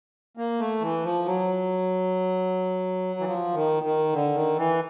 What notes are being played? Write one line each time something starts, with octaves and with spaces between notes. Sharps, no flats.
A#3
A3
E3
F3
F#3
E3
F3
D#3
D#3
D3
D#3
E3